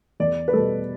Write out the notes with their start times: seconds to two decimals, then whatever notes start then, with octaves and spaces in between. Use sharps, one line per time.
0.20 E2 D5
0.48 B4
0.53 B2 G3 A4